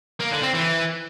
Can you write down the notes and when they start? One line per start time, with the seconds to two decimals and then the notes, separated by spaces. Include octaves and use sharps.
0.20 A#3
0.32 D3
0.43 C4
0.55 E3